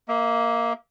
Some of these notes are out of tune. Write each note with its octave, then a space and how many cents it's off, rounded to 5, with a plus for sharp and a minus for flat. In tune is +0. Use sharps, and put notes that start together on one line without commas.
A#3 +0 E5 -40